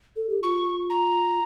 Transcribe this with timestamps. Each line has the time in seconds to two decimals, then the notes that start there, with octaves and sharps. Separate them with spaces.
0.16 A4
0.30 G4
0.43 F4 C#6
0.90 A#5